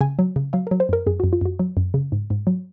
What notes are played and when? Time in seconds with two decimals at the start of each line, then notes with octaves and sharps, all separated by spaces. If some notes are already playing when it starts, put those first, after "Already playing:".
0.01 C#3 G#5
0.19 F#3
0.36 C#3
0.53 F#3 F5
0.67 A#4
0.71 F#3
0.80 C5
0.89 F#2 A#4
1.07 F#2 G#4
1.20 F#2 F#4
1.33 F4
1.41 F#2 F#4
1.59 F#3
1.77 F#2
1.94 C#3
2.12 G#2
2.30 G#2
2.47 F#3